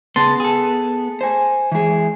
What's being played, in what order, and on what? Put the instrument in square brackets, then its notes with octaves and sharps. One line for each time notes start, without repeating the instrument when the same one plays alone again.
[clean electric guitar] C#3 A5 C6 [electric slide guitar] B3
[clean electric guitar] G#4 A4
[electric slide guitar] C5 G#5
E3 G#3 G#4